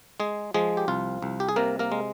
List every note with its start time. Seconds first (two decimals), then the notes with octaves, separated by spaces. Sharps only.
0.20 G#3 G#4
0.54 F3 G#3 G#4
0.77 G4
0.88 C2 F4
1.22 C2
1.40 G4
1.49 G#4
1.56 C3 A#3 A#4
1.79 A#3 A#4
1.92 G#3